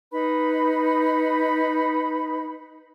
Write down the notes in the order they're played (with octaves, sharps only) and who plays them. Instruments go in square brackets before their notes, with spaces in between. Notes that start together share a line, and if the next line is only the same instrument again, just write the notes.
[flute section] D#4 B4 B5